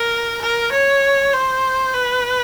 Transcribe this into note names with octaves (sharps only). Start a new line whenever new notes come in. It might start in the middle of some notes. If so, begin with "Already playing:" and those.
Already playing: A#4
A#4
C#5
C5
B4